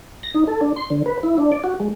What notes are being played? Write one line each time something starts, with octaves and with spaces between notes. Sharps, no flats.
A#6
D#4
A4
D4
C6
D3
B4
E4
D4
D5
F#4
G#3